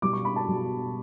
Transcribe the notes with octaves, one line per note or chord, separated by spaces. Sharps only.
B2 G3 D6
C#6
B5
A5
B2 G3